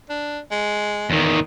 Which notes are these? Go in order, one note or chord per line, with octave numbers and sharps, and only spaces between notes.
D4
G#3
E2 D#3